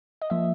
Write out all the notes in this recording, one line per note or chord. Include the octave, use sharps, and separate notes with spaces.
D#5
F3 A#3 E5